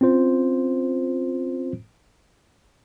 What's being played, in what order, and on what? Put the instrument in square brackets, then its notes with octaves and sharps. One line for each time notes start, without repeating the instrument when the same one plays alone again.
[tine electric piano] C4 C#4 F4 C5